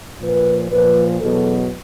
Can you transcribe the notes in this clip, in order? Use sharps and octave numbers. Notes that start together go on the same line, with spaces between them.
A#2 F3 B4
A#2 F3 B4
E2 B2 F#3 A4